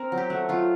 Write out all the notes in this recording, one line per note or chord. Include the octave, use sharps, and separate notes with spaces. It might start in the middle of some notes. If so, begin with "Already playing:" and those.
Already playing: C4 A#4
F#3
G4
A3 F#4
F#3 F4